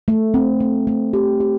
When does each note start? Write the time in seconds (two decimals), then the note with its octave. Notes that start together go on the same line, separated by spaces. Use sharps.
0.08 A3
0.34 C4
0.60 A3
0.87 A3
1.13 G4
1.40 G4